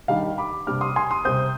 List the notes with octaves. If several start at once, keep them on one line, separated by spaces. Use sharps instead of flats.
D#3 G3 D4 F5
B5 D6
C3 G3 D4 D6 F6
C6 D#6
G#5 C6
C6 D#6
C3 G3 C4 D#6 G6